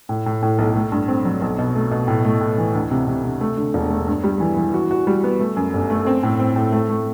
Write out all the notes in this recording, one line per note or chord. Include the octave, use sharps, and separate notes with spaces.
A2
A2
A2
B1
A3
G2
C4
F#3
B1
B2
A3
B2
A2
A3
A2
E3
D2
C3
C3
C3
A3
D3
E1
A3
G2
G3
E3
E3
F#4
F#4
G3
B3
A3
F#2
G1
A3
C4
A2
C4
A2
A3
A3